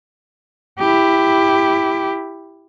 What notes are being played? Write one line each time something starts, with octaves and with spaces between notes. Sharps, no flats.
E4 G4